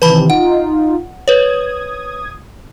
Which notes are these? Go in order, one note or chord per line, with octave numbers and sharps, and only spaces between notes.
C3 D#3 E3 B4 A5 B5
D#4 F4 F#5
B4 C#5 D#6 G#6